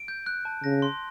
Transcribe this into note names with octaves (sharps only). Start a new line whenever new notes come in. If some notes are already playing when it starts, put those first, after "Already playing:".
Already playing: D7
G6
F#6
A5
C#3 A#6
C6